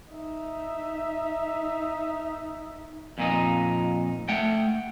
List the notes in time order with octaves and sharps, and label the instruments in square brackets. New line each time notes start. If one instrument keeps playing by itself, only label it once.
[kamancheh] D#4 E5
[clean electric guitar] F2 A#2 D#4
A3 F#5 G5